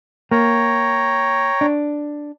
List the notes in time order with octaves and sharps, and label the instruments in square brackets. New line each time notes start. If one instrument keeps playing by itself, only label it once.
[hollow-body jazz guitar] A#3 [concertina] C#5 G5 A#5
[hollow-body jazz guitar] D4